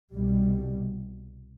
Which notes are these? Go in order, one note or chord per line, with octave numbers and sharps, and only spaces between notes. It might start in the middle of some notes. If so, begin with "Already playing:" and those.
C2 B2 G3